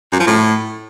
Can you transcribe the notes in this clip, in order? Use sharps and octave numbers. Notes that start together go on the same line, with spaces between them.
F#2
F3
A2